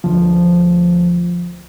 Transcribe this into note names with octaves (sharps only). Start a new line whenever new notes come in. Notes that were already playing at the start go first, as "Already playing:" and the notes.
D2 F3